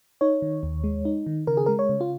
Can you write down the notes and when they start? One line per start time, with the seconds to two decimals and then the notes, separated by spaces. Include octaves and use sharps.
0.21 D#4 C#5
0.42 D#3
0.63 D#2
0.84 G#3
1.05 D#4
1.27 D#3
1.47 C#3 A#4
1.57 G#4
1.66 G#3 A#4
1.79 C#5
1.89 C#3
2.01 F4